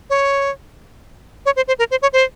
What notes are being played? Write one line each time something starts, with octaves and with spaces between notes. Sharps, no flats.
C#5
C#5
C5
C5
A#4
C5
C#5
C5